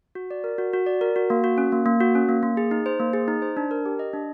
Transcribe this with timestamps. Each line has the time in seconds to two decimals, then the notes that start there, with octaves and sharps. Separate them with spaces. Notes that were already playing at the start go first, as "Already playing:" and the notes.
0.15 F#4
0.31 D5
0.44 A#4
0.58 F#4
0.73 F#4
0.86 D5
1.01 A#4
1.16 F#4
1.30 A#3
1.44 F#4
1.58 C#4
1.72 A#3
1.86 A#3
2.00 F#4
2.15 C#4
2.29 A#3
2.43 A#3
2.57 G#4
2.71 D#4
2.86 C5
3.00 A#3
3.13 G#4
3.28 D#4
3.42 C5
3.57 D4
3.71 A#4
3.86 G4
3.99 D#5
4.13 D4